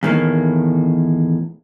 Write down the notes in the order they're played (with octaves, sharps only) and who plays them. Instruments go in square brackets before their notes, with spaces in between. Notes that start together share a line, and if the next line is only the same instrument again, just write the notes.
[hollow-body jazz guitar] E2 A2 D#3 A#3